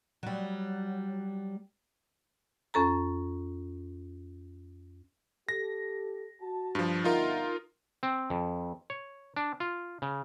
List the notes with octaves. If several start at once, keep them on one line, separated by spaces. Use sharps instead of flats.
F#3 G3
F2 C#4 A4 A#5
G4 A4 A#6
F#4 A5
G2 F3
G1 D#4 F4 A#4 E5 F#5
C4
F2
C#5
D4
F4
C#3